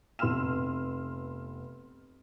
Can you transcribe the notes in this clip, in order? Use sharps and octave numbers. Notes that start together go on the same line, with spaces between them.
F1 B3 C6 E6 F6 E7